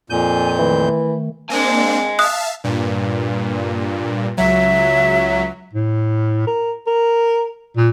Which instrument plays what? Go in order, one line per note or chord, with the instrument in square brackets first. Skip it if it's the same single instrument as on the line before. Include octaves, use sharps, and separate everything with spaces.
[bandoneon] F2 A#2 G6 [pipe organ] G#5
[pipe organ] D#3 A3 [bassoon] E3
[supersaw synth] A#3 C4 D4 [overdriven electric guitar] D#5 G#5
[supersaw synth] E5 F5 A5 [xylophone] D#6 F#6
[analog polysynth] G2 A#2
[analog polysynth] C#2 F#3 [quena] E5
[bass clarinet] A2
A#4
A#4
A#2